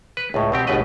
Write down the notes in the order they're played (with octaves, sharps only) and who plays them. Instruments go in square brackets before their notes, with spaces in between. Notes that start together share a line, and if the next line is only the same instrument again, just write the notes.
[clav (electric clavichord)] B4
C#2 A2
B2 C4 G4
G1 C#2 B2 A3 B4 D#5